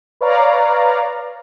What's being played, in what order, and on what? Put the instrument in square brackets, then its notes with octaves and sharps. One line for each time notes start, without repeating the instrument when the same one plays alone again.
[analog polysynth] B4 C#5 D5 F5 A#5